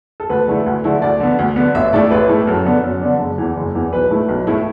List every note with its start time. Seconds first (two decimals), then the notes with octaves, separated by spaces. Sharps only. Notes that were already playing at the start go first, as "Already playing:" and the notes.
0.20 A4
0.30 D2 B4
0.48 D3 A3 E4
0.66 D2
0.84 D3 A3 E4
1.02 D2 D5
1.20 D3 B3
1.39 D2
1.56 D3 B3
1.74 A1 E5
1.93 A2 A3 E4 D5
2.11 A1 B4
2.29 A2 A3 E4
2.47 F#2 A4
2.65 D3 B3 D4
2.84 F#2
3.01 D3 B3 D4
3.20 F#1
3.38 E2 E3
3.57 F#1
3.75 E2 E3
3.93 B1 B4
4.11 A2 A3 E4
4.29 B1
4.47 A2 A3 E4